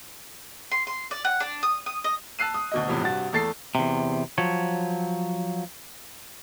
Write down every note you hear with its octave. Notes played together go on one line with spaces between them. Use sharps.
C6
C6
D5
F#5
D4
D#6
D#6
D#5
A5 E6 F#6 C7 D#7
D#6
D2 B2 D#5
E2 A2 C3 F3
G2 C3 F#4 A6
E2 A3 A4 A6 C7
E2 C3
F3 F#3 C#5